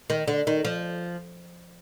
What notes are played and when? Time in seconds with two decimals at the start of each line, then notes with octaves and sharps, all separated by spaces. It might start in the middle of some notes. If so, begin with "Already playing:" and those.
0.10 D#3
0.28 D3
0.47 D#3
0.65 F3